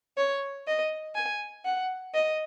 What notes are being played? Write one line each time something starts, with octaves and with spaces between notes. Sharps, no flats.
C#5
D#5
G#5
F#5
D#5